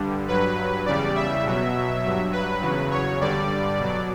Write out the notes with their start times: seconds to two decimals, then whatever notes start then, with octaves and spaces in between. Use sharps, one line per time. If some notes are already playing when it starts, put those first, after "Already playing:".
Already playing: G2 D3 G3
0.28 G2 F#3 B4
0.86 E2 C#3 G3 D5
1.15 E5
1.45 B2 F#3
2.03 G2 F#3
2.33 B4
2.62 E2 C#3 F#3
2.91 C#5
3.21 G2 D3 G3 D5
3.79 B2 F#3